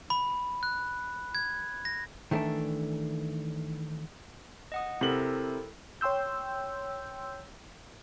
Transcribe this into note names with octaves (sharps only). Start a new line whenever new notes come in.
B5
F#6
G#6
A#6
D#3 E3 A3 C#4 D4
D#5 F#5 D#6
C3 E4 A4 A#4 F#7
C#5 G5 C6 E6 G6